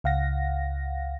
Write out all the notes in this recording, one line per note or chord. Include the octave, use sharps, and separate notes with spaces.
C#2 F5 F#5 A#6